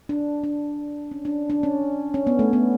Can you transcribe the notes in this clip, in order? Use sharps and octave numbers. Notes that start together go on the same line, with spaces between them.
D4
D4
C#4
D4
D4
C#4
C#4
B3
A3
B3